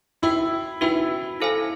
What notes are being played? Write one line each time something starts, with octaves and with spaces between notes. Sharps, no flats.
D#4 E4 F#4 B4 E5 G5
D#4 E4 F#4 B4 E5 G5
E4 A4 C5 F5 G#5